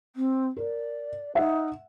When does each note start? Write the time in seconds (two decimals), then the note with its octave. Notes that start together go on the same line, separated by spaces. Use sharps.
0.15 C4
0.57 A#4 D5
1.35 D#4 E5 F#5